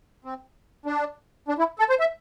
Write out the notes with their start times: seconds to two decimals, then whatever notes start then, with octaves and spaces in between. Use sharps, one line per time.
0.25 C4
0.86 D4
1.49 D4
1.59 E4
1.79 A4
1.89 C5
2.00 E5